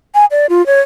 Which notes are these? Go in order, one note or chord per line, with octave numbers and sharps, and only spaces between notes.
G#5
D5
F4
C#5